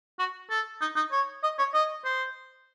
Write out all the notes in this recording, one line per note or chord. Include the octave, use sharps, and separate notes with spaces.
F#4
A4
D#4
D#4
C#5
D#5
C#5
D#5
C5